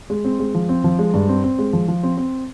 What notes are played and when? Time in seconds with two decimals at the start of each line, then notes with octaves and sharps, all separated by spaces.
0.10 G#3
0.25 C4
0.39 G#3
0.55 F3
0.69 C4
0.84 F3
0.99 G#3
1.14 G2
1.29 C4
1.44 C4
1.59 G#3
1.73 F3
1.88 F3
2.03 C4
2.17 C4